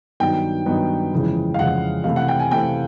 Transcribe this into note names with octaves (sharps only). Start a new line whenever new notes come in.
G2 D#3 F#3 B3 D#4 G5
G2 D#3 F#3 B3 D#4
F2 C#3 E3 G#3
F5
F2 C#3 E3 G#3 F#5
C3 E3 A3 C4 E4 F5
F#5
G5
G#5
C3 E3 A3 C4 E4 G5